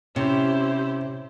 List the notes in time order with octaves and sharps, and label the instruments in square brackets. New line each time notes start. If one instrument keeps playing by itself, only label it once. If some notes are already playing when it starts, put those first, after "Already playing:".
[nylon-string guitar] C3 [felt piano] C#4 [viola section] E4 G4 C5